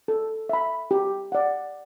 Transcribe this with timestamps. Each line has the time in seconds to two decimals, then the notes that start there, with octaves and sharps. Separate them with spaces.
0.08 A4
0.49 E5 B5
0.91 G4
1.32 D5 F#5